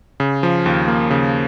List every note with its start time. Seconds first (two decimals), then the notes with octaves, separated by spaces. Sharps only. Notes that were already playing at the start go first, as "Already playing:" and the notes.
0.20 C#3
0.43 F3
0.66 D#2
0.88 A#3
1.11 C#3